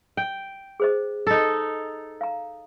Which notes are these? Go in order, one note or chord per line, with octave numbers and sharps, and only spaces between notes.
G5
G#4 C5 D#5
D#4 A4
F5 A#5